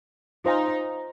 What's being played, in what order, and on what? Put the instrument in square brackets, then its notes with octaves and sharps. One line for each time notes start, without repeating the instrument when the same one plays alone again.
[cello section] D#4 [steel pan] F4 C5 F5 G#5 C6